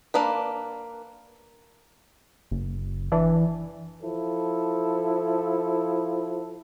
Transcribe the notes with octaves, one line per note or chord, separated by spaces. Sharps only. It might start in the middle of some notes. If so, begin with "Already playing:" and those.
A#3 D4 B4
F#1
E3 D4
F3 E4 A4